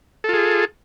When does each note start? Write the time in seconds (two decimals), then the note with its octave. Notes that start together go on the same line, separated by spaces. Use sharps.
0.24 A4
0.29 F4
0.33 G#4